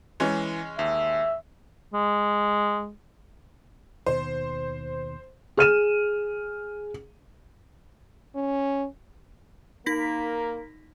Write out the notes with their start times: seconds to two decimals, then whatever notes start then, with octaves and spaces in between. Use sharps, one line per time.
0.20 E3 G#3 C#4
0.79 D#2 E5
1.93 G#3
4.06 D#2 B2 D#3 C5
5.57 G#4 F6 D#7 E7
8.35 C#4
9.86 A#3 D#4 A#4 A#6 B6